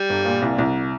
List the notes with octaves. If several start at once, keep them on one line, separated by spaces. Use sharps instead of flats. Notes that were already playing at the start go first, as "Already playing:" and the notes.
Already playing: G3
G1
A#2
C2
C2